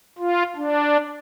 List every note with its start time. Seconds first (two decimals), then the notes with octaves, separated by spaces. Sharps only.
0.19 F4
0.56 D4